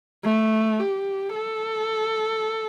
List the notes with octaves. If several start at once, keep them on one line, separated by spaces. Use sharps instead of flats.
A3
G4
A4